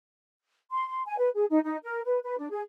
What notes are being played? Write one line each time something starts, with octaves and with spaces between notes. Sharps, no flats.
C6
C6
G#5
B4
G#4
D#4
D#4
A#4
B4
B4
D4
G#4